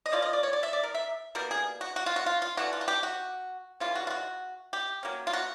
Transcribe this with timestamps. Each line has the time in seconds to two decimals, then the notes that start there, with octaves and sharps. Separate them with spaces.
0.06 D#5
0.12 F3 A#3 C#4 F4 D5
0.22 D#5
0.33 D5
0.43 C#5
0.53 D5
0.63 E5
0.73 D5
0.83 A#4
0.95 E5
1.35 B2 G3 A#3 A#4
1.51 G#4
1.81 F#4
1.96 F#4
2.06 F4
2.16 F#4
2.26 F4
2.42 F4
2.57 E3 A3 D4 F#4
2.73 F4
2.81 F#4
2.88 G4
3.03 F#4
3.80 C#3 E3 G3 F4
3.95 F#4
4.07 F4
4.10 F#4
4.73 G4
5.03 F#3 A#3 C#4
5.27 F4
5.33 F#4